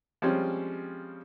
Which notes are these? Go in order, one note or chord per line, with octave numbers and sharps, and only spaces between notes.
F3 G3 G#3 C4 C#4